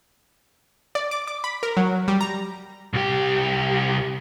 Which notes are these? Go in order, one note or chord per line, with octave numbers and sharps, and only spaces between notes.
D5
D6
D6
B5
A#4
F#3
G3
A#5
C2 G4